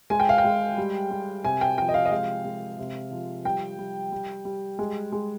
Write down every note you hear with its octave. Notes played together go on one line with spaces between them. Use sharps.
G#3 G#5
G5
F5
G5
G#3
G3
G3
C3 G#5
G5
F3 G5
D#5
F5
D#5
G#3 F5
G#3
C3
F3
G3 G5
G3
G3
G3
G#3
G#3